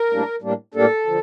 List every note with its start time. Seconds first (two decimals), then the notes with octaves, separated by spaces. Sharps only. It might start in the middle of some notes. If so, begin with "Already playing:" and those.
Already playing: A#4
0.10 A2 G3 A#3 D4
0.42 A2 G3 A#3 D4
0.74 A2 G3 A#3 D4 A4
1.06 D3 F3